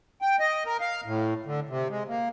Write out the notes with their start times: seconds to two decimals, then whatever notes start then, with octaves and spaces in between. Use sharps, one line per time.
0.22 G5
0.40 D#5
0.66 A#4
0.81 F5
1.05 A2
1.46 D3
1.69 C3
1.90 G#3
2.08 A#3